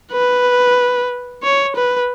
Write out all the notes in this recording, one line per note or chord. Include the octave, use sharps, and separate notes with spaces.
B4
C#5
B4